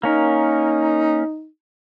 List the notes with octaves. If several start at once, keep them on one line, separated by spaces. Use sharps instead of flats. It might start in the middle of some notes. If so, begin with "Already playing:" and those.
A#3 C#4 D#4 A#4